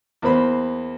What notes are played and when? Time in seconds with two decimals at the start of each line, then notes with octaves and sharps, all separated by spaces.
0.22 E2 A#3 C5 B5